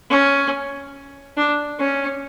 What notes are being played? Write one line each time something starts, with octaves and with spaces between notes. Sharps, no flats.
C#4
D4
C#4